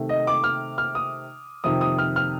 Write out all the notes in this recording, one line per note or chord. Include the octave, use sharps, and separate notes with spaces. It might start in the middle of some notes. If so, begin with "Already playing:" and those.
Already playing: C3 D#3 A3
D#5
D6
F6
F6
D#6
F2 C3 D#3 D#6
D#6
F6
F6